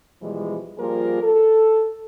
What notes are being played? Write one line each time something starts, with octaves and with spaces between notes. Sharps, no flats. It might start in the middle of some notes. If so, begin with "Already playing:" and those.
B2 E3 F3 G3 G#3
F3 G3 A#3 F4 G#4 A#4
A4